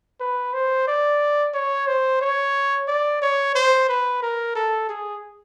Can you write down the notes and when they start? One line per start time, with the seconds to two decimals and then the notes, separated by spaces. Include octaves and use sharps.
0.20 B4
0.53 C5
0.88 D5
1.54 C#5
1.87 C5
2.21 C#5
2.88 D5
3.22 C#5
3.55 C5
3.89 B4
4.22 A#4
4.55 A4
4.89 G#4